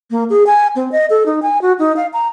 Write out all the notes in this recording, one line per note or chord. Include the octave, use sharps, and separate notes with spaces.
A#3
G#4
G#5
C4
D#5
A4
D#4
G#5
F#4
D#4
F5
A#5